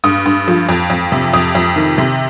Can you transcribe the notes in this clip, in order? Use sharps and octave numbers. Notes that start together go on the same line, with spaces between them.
G2 D#6
G2
F3
F2
F2
C3
F2 D#6
F2
D#3
C3